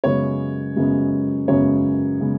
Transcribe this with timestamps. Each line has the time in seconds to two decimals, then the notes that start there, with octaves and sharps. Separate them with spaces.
0.04 F#2 C#3 G#3 B3 C#5
0.76 F#2 C#3 G#3 B3
1.48 F#2 C#3 G#3 B3 C#5
2.20 C#3 G#3 B3